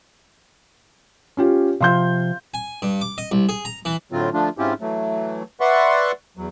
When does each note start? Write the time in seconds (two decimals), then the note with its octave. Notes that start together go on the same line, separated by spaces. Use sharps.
1.37 C#4 F4 G4
1.81 C3 F3 F5 C6 G6
2.54 G#5
2.82 G2
3.01 D6
3.18 D#5
3.32 C2
3.49 G#4
3.65 A#5
3.85 E3
4.12 A2 D3 F#3 C4 F4
4.34 D3 F3 A3 D4 F4
4.58 G#2 C4 C#4 E4 F4 G4
4.81 E3 F#3 A3
5.60 B4 D5 E5 F#5 C6 C#6
6.37 E2 F#3